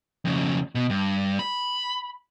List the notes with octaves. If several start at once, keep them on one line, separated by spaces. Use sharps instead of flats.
F2 C#3
B2
G2
B5